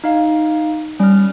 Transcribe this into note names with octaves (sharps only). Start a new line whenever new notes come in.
D#4 F5
G3 C#4 F6